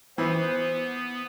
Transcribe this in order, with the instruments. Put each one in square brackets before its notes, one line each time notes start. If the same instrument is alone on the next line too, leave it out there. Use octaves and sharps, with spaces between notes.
[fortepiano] E3 [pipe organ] B3 [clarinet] C5